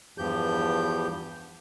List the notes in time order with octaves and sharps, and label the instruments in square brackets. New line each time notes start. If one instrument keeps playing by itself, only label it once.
[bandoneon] E2 G2 F3 G4 G6